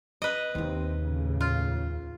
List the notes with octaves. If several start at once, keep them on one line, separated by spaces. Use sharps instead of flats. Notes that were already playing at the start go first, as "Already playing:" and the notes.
B4 D#5
D#2 C3 C4 D#4
C#2 A2 C#3
F4